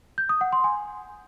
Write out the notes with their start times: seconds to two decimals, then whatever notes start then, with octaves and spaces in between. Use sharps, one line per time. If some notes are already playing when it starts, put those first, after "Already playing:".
0.18 G6
0.29 D#6
0.41 F#5
0.53 C6
0.64 G#5